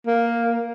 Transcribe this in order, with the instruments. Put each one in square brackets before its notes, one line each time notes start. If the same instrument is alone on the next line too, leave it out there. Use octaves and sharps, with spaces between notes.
[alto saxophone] A#3